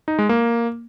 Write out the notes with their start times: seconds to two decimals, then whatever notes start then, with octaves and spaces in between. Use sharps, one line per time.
0.08 D#4
0.19 G#3
0.29 A#3